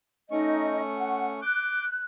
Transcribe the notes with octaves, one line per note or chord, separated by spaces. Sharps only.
A3 C#4 D#4 D#5 C#6
F#5
D6 F#6 G6